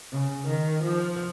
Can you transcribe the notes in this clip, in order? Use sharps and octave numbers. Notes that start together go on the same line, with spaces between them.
C#3
D#3
F3